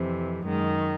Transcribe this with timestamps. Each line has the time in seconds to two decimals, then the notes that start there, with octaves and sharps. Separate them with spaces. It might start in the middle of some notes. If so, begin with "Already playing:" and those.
Already playing: F2 C3 E3
0.45 F#2 D#3 G#3